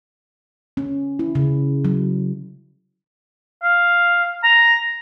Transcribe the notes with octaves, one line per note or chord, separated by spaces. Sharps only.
C#4
E4
C#3
F#3
F5
A#5